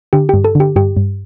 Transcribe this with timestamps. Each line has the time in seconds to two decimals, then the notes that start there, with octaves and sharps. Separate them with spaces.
0.13 D3 G4
0.29 G2 G4
0.44 A4
0.55 D3
0.60 G4
0.76 G2 G4
0.97 G2